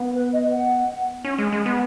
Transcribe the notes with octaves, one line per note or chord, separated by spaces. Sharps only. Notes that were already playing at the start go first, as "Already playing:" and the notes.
Already playing: B3
B4
D#5
F#5
C#4
G#3
G#3
B3